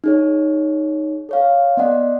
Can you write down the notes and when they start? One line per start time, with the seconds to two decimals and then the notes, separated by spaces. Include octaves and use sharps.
0.04 D#4 G#4 C#5
1.29 A4 C#5 F5
1.77 B3 D5 D#5 F#5